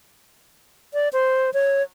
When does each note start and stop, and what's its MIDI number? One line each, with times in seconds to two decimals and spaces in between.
0.94 1.09 74
1.13 1.53 72
1.54 1.83 73